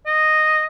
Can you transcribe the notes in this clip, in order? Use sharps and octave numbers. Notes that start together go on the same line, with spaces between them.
D#5